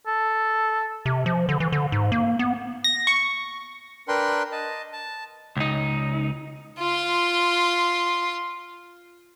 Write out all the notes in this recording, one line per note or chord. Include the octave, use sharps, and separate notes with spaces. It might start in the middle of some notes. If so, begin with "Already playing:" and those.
A4
C3
F3
D3
E3
D3
G#2
A#3
B3
A#6
C#6
D4 A#4 B4 G5 C6
D#5 A5
A5
C#2 D#4
F4 C6